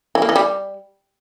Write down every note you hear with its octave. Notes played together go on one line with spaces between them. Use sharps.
E3
A#3
E3
G3